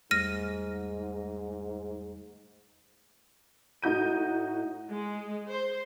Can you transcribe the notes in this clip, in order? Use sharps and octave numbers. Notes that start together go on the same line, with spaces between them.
E2 G#2 G3 A3 F6 A#6 D#7
A2 D#4 F#4 G6 D#7
G#3
C5